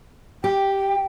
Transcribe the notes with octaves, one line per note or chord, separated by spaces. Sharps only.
G4 G5